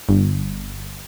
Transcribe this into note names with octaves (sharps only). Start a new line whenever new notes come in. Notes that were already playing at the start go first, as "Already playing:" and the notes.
G1